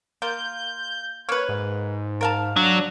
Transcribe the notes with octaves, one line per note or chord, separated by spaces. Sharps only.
A#3 F4 G6
A#3 B4 C#5
G#2
A#4 F5 A5
F#3 D4